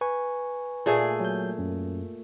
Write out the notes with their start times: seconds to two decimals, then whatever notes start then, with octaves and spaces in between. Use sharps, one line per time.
0.01 B4 G#5 C#6
0.86 A#2 A3 G#4
1.20 F#3 G6
1.59 F#2